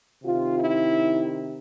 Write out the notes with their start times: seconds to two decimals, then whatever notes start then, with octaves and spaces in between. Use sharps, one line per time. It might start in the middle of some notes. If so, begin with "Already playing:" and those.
0.24 C3 D#3 F4
0.60 E4